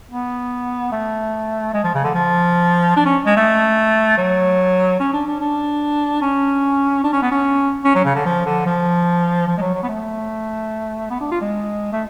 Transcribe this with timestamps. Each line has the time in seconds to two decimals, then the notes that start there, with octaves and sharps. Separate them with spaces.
0.11 B3
0.92 A3
1.74 G#3
1.84 F3
1.94 C#3
2.04 D3
2.14 F3
2.96 D4
3.06 C#4
3.26 G#3
3.37 A3
4.17 F#3
4.99 C#4
5.13 D4
5.27 D4
5.40 D4
6.21 C#4
7.04 D4
7.13 C#4
7.22 B3
7.31 C#4
7.84 C#4
7.95 F#3
8.05 C#3
8.15 D3
8.25 F3
8.46 D3
8.66 F3
9.48 F3
9.57 G#3
9.61 F#3
9.74 F#3
9.83 B3
9.88 A3
11.10 B3
11.20 D4
11.31 F4
11.41 G#3
11.92 A3